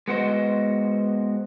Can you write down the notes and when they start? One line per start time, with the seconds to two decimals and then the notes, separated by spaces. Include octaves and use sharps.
0.08 G#3 B3 F#4 C5 D#5